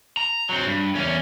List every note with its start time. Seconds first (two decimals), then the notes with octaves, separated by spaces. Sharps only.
0.17 A#5
0.49 F#3 C4
0.65 G2
0.95 E2 C#4